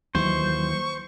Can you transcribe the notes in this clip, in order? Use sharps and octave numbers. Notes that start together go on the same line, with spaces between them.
D#2 E3 F#3 C5 C#6